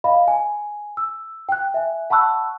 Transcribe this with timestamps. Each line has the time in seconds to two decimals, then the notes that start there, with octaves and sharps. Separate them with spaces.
0.04 D#5 F5 B5
0.28 G#5
0.97 E6
1.49 G5 F#6
1.74 E5 G#5
2.10 F#5 A5 B5 C#6 E6 F#6